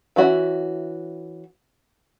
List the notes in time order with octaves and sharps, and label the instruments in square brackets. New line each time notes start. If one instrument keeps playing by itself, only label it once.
[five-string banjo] E3 C#4 F#4 E5